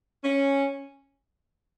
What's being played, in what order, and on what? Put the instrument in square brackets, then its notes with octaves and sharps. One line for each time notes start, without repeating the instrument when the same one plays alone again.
[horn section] C#4